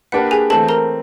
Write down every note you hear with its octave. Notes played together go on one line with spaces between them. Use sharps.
A#3 D4 G4 B4 F#5
G#4 G#5
E3 A3 C4 A4 A5
A#4 A#5